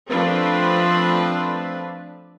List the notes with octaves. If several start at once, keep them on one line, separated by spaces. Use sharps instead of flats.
F3 A3 C4 D4 B4